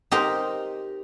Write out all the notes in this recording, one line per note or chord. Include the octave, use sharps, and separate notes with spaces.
D#4 G4 A#4 C5